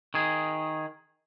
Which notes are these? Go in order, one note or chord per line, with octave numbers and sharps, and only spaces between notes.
D#3 G#4